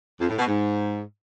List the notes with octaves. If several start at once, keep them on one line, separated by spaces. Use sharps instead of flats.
F2
A2
B2
G#2